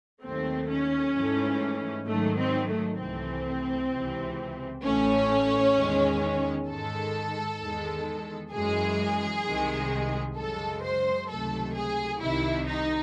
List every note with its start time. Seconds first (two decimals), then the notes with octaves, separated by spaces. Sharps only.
0.23 D#2 D#3 F#3 A3 C4
0.69 C#4
1.15 G#2 E3 A3
2.07 G#2 D#3 F#3 A3
2.38 C4
2.69 A3
2.99 C2 C3 E3 A3 C4
3.92 C#2 C3 E3
4.84 A1 A2 E3 A3 C#4
5.75 E2 D#3 G#3
6.68 G#2 D#3 G#3 A4
7.60 E2 D#3 G#3
8.52 F#2 E3 G#3 G#4
9.45 C2 C3 D#3 G#3
10.36 F#2 C#3 G#3 A4
10.82 C5
11.28 C#2 C3 D#3 F#3 A3 A4
11.75 G#4
12.21 C2 C3 D#3 E4
12.67 D#4